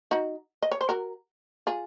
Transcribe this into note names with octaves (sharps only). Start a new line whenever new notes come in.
D#4 F#4
D#5
C#5
C5
F#4 A#4
F4 G#4